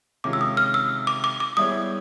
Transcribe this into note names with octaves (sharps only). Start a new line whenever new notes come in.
C3 D#3 G#3 C#4 F4 D6
E6
D#6
F6
E6
D6
D6
D6
G3 B3 E4 G#4 C#5 D#6